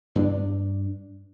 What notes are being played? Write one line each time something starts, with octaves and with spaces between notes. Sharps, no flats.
G2 C4 D4